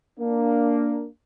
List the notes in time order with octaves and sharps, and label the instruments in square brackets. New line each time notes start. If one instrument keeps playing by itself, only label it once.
[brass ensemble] A#3 D4